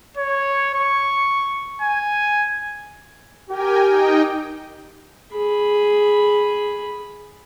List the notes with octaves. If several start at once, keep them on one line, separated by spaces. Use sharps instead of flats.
C#5
C#6
G#5
G4 A#4 G5 G#5
D#4 D#5 G5
G#4 B5